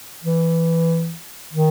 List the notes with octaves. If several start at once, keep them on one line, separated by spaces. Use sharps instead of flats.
E3
D#3